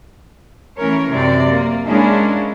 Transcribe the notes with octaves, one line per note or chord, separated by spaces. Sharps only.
E3 A3 C#4 A#4 C#5
F#2 C3 C4 D5
A#3
G#3 A#3 C#4 D4 E4